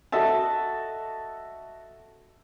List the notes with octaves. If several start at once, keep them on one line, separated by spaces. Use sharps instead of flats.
F#4 A4 D#5 E5 A5